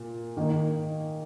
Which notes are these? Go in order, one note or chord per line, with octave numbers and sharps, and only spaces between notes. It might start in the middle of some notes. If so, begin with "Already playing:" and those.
Already playing: A#2
D#3 A#3 D#4